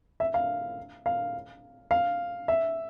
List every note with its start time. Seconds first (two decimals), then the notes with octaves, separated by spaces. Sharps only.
0.20 E5
0.34 F5
1.06 F5
1.91 F5
2.48 E5